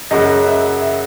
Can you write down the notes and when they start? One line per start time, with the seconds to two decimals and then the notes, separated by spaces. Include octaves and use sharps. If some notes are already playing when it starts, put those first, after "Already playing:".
0.11 F#2 C#3 F#3 D#5
0.47 E5
0.82 E5